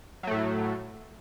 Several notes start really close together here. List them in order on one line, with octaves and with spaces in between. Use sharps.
F#3 A3 A2